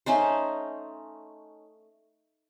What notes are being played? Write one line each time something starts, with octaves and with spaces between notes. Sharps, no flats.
A3 C#4 D#4 C5